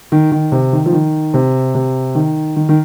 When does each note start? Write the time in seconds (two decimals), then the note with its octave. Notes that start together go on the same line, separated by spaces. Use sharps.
0.12 D#3
0.32 D#3
0.52 C3
0.73 D#3
0.86 F3
0.93 D#3
1.34 C3
1.75 C3
2.15 D#3
2.56 D#3
2.69 D#3